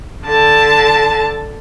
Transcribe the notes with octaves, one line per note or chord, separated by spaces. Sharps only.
D3 A5